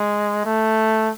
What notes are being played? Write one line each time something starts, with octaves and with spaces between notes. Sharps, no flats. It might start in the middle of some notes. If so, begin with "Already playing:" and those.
Already playing: G#3
A3